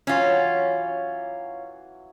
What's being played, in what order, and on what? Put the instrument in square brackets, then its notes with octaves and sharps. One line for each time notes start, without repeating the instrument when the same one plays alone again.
[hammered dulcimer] E3 F#3 [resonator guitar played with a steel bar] C#4 F4